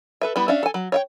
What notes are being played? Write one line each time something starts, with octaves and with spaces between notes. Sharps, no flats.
A4 B4 E5
G3 B3 E4
C#4 D4 E5 F5
A4 G#5
F#3
C#5 E5 G5